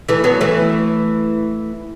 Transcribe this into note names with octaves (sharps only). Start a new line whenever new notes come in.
E3 A3
F#3 B3
E3 A3